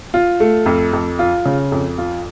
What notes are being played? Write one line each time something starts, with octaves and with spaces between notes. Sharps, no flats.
F4
A3
F2
F2
F4
C#3
F2
F4